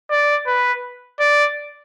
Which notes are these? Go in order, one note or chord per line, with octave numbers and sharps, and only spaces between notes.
D5
B4
D5